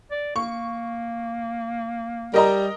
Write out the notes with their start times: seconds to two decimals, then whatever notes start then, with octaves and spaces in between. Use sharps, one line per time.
0.11 D5
0.36 A#3 C#6
2.34 G3 A#4 D#5 A#5